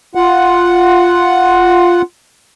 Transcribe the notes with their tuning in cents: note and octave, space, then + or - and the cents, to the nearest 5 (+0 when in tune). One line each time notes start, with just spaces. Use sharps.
F4 +0 F#5 +0